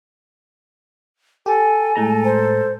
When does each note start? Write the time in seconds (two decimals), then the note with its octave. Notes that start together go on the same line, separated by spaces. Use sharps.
1.46 G4 A4 G#5
1.95 A2 G#3 A4 A#5
2.24 C5